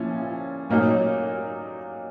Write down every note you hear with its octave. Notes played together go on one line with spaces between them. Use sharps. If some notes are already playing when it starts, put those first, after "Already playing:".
Already playing: A#2 F3 C#4 E4
A#2 F#3 A#3 D#4